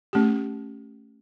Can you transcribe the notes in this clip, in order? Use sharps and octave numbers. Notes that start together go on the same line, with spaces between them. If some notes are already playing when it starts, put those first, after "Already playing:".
A3 C#4 G4